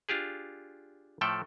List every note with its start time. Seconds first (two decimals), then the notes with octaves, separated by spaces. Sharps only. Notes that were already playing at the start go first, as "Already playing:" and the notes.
0.09 D4 F4 G4 G#4
1.21 A2 F3 A3 A4 G5